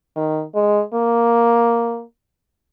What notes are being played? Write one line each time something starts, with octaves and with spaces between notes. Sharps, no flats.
D#3
G#3
A#3